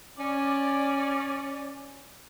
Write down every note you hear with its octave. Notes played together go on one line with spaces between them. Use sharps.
C#4 D5